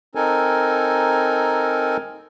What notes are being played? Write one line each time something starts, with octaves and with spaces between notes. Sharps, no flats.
C4 D#4 A4 A#4 G#5